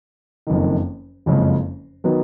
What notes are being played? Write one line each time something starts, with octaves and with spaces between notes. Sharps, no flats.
F#1 F2 D#3
F#1 F2 C#3 G#3
D#3 F#3 B3